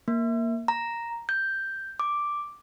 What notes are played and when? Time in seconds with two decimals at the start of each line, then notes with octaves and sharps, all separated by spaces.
0.08 A#3
0.68 A#5
1.29 G6
2.00 D6